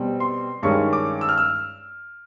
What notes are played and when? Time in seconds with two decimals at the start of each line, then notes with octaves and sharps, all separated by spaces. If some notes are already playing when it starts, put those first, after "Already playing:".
Already playing: B2 G3 C4
0.20 C6
0.63 G2 D#3 G#3 C#4 C#6
0.93 D6
1.21 E6
1.29 F6
1.38 E6